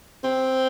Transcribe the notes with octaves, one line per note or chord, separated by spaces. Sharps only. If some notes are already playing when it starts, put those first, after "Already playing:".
C4